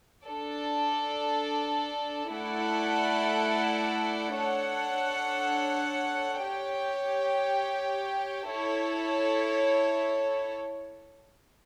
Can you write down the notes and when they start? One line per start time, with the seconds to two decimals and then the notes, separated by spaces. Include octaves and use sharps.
0.25 D4 A4 D5
2.31 A3 E4 A4 D5 F#5
4.37 D4 A4 C#5 F#5
6.43 G4 C#5 G5
8.49 E4 A4 C#5